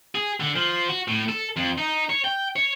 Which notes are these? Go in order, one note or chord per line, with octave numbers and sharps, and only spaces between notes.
G#4
D3
F3
F#4
A2
A4
F2
D#4
C#5
G5
C#5